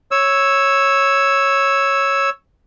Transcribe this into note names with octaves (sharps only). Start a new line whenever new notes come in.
C#5 E6